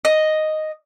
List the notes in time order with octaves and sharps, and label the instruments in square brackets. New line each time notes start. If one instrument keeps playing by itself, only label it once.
[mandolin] D#5